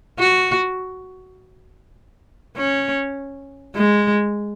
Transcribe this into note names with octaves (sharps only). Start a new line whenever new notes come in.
F#4
C#4
G#3